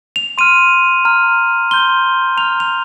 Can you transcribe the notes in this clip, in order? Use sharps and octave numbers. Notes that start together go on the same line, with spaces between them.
F7
C6 F6 D#7
A#5 F6
C6 G6 G7
A#5 F6 F7
F7